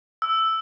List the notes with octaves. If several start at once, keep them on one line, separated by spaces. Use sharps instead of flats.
E6